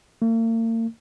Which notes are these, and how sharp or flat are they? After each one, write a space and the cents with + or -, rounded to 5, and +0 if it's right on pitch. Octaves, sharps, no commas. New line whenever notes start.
A#3 -45